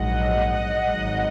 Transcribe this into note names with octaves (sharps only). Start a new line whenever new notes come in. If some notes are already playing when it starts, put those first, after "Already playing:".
Already playing: A#1 G#2 F#3 D#5 F#5
G#1 G#2 F#3